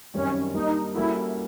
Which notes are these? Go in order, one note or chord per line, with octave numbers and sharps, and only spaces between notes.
F#2 D#3 G3 C4 C#4
G3 A#3 D4 D#4
G3 A#3 C#4 E4 F#4 A4